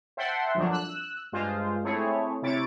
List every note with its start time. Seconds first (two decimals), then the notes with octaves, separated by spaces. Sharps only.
0.17 C5 E5 F#5 G5 A5 C6
0.55 G1 F2 A#2 F3 F#3 D4
0.72 E6 F#6
1.32 G2 G#3 F4 C5
1.84 A3 C4 E4 G#4 C#5
2.42 C3 E4 C#5 A6 D7